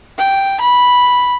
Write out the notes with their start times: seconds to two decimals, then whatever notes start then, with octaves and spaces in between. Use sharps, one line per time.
0.19 G5
0.60 B5